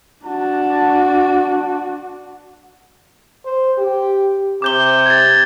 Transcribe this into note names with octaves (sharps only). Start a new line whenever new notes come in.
D4 F#4 A5
C5
G4
C3 D6 G6 G7
G#6 A6